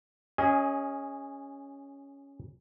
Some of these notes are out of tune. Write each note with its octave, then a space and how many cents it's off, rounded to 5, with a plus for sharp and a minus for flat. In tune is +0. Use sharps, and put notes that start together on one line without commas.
C#4 +5 G#4 -10 D#5 +30